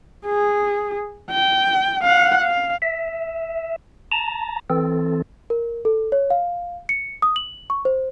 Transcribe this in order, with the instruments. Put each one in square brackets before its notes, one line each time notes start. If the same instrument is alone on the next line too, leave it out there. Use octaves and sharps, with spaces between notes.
[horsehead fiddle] G#4
G5
F5 F#5
F5
[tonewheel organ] E5
A5 A#5
E3 C4 A4
[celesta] A#4
A4
C#5
F5
C#7
D#6
F#7
C#6
C5